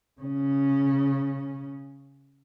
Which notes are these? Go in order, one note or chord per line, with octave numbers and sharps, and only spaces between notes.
C#3 C#4